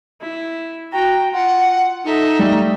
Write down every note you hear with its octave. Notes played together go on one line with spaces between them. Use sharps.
E4
F#4 G5 A#5
F4 F#5
D#4 A4 E5
G3 A3